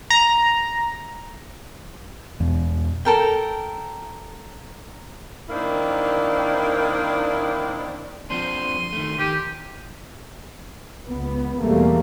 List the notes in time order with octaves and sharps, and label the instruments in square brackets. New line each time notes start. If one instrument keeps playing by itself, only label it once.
[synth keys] A#5
[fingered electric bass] E1
[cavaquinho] A4 A#4 G5
[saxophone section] D#3 A#3 C4 D4 E4
[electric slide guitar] F3 C4 D4 [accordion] C6 [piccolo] D#7
[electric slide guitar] D#3 A3
[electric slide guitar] D#3 [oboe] G4
[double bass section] C#2 B3
E2 B2 E3 G3 A3 A#3